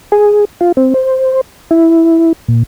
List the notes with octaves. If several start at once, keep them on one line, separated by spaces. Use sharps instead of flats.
G#4
F4
C4
C5
E4
A#2